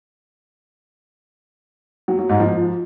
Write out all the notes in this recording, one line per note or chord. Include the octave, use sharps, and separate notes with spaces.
F#3
F#3
G#2
F3